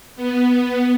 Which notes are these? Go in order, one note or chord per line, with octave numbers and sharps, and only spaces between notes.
B3
B3